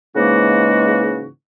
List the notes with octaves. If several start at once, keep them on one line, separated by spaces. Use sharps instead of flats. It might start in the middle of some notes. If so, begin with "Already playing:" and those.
G#2 C#3 E3 G#3 A#3 F#4